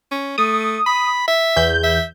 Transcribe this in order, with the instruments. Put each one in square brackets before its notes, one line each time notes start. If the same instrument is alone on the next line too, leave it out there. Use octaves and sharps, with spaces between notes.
[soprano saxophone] C#4
[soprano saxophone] A3 [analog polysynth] D#6
[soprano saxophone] B5
E5
[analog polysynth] E2 G6
[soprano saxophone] E5